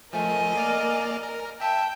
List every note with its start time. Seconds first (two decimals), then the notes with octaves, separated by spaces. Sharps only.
0.13 F3 A3 A#4 D#5 G#5
0.55 A#3 D5 F6
1.23 A#4
1.61 E5 G5 A5